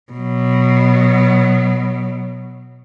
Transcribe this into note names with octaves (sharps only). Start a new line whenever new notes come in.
B2 F#3